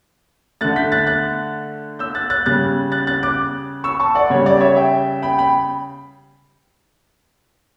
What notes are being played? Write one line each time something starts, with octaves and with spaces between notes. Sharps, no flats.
D3 A3 F#6 A6
G6 B6
F#6 A6
F#6 A6
E6 G6
F#6 A6
F#6 A6
C#3 G3 F#6 A6
F#6 A6
F#6 A6
D6 F#6
C#6 E6
A5 C#6
D5 F#5
C#3 G3 C#5
D5
C#5 E5
E5 G5
G5 B5
G5 B5